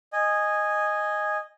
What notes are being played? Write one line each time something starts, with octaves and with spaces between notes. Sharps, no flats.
D#5 G#5